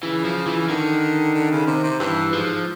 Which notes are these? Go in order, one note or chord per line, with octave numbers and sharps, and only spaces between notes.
C#3 E3
F3
E3
D3 D#3
D3
C#3
C3
C3
G2 E3
G#2 F3